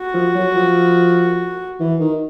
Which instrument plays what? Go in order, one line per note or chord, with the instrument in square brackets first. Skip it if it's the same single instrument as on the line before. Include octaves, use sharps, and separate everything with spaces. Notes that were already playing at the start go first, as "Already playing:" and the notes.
Already playing: [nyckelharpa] F#4
[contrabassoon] F3
F#3
F3
E3
D#3